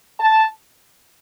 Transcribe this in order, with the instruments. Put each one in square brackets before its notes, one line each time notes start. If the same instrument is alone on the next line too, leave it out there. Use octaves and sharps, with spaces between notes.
[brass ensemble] A5